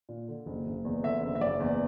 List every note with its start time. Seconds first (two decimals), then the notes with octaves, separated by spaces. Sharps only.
0.09 A#2
0.28 D3
0.46 F#1
0.66 F#1
0.85 E2
1.03 D3 E5
1.22 F#1
1.35 E5
1.41 F#1 D5
1.60 E2